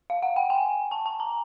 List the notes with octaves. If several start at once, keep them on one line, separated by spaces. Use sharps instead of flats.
F5
F#5
G5
G#5
A5
A5
A#5